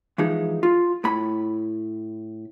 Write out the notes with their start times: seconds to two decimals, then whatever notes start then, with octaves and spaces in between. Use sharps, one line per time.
0.18 E3 F3 G#3 D#4
0.63 F4
1.04 A2 B5